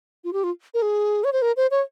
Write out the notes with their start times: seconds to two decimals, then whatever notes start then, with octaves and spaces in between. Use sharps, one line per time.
0.24 F4
0.33 G4
0.44 F4
0.74 A#4
0.82 G#4
1.24 C#5
1.33 C5
1.42 A#4
1.57 C5
1.71 C#5